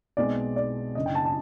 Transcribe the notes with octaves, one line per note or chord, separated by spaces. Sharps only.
B1 B2 G#3 C4 D5
D5
F#1 F#2 D3 D#5
G5
A5
A5